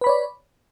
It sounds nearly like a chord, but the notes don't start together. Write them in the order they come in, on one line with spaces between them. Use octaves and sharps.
B4 B5 C#5 D5